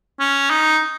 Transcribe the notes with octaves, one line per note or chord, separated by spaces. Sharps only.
C#4
D#4